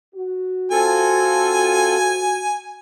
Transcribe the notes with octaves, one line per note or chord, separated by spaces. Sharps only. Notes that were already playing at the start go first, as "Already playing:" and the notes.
F#4
C4 F4 A4 G#5